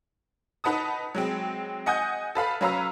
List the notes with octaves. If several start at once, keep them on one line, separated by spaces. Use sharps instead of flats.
D#4 B4 F#5 A5 D#6
F#3 G#3 C4
D#5 F#5 G#5 D#6 G6
A4 B4 F5 B5
F#3 C#4 B4 F5 A#5 E6